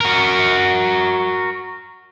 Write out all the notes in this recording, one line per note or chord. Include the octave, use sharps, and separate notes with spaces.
F#4 A#4